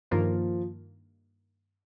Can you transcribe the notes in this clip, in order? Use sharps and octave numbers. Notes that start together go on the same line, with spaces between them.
G2 D#3 F3 A#3 F4 A#4